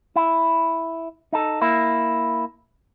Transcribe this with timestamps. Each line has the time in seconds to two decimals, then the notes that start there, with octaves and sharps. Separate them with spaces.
0.16 E4
1.33 D#4 A4
1.61 A#3 E4